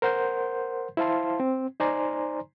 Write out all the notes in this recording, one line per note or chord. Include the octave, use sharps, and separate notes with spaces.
A#4 C5 F#5 C6 G6
E4 C5 F5 A5 C6
C4
D#4 C5 D5 G#5 A#5 C6